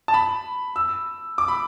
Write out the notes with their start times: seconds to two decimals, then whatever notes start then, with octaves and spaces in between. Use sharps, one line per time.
0.08 A5
0.14 B5
0.76 E6
1.38 D6
1.48 B5